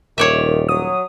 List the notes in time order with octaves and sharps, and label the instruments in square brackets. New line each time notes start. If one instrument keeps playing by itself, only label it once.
[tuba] D#1 [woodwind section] D#3 [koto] C#5 D5 E5
[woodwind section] F#3 [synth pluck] D#6